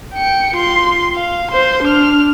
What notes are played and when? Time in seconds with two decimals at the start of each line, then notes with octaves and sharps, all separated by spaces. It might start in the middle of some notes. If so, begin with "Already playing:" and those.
0.15 G5 C#7
0.55 F4 C6
1.16 F5
1.52 C5 C6
1.83 D4 F6